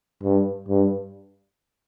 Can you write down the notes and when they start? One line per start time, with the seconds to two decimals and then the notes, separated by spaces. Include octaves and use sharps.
0.23 G2
0.69 G2